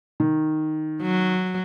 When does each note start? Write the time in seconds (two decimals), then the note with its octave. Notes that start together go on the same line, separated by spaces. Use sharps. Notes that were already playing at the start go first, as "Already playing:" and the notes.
0.20 D#3
1.02 F#3